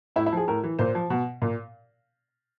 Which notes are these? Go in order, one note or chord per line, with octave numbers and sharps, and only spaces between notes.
A2 E4
E4
F3 G#4
A2 A#4
E3
A#2 C5
F3
B2
A#2